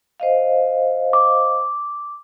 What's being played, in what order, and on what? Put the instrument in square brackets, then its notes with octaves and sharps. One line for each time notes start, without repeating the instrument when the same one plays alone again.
[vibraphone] C5 D#5 F5
[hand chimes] D6